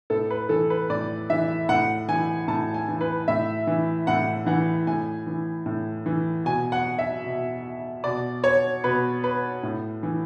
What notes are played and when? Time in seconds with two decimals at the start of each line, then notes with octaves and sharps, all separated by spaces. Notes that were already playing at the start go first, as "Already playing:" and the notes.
0.10 A2 A4
0.30 B4
0.49 E3 A4
0.70 B4
0.90 A2 D5
1.30 E3 E5
1.69 A2 F#5
2.08 E3 G#5
2.48 A2 A5
2.74 G#5
2.88 E3
3.01 B4
3.28 A2 E5
3.67 E3
4.07 A2 F#5
4.46 E3 F#5
4.87 A2 G#5
5.27 E3
5.66 A2
6.06 E3
6.45 B2 G#5
6.72 F#5
6.99 E5
7.24 B2
8.04 B2 D5
8.44 C#5
8.84 B2 B4
9.24 B4
9.63 A2
10.03 E3